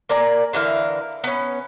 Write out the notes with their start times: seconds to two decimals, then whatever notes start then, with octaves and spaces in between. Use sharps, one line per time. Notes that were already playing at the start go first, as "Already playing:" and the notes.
0.09 A#3 A#4 D5 G#5
0.53 D3 E3 A#4 F5
1.24 B3 C#4